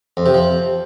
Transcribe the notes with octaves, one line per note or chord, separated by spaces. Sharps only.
F2
C3
F3